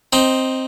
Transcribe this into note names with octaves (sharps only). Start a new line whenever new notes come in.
C4 D#4